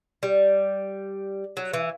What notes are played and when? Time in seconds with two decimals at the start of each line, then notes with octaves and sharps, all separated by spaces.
0.23 G3
1.57 F#3
1.73 E3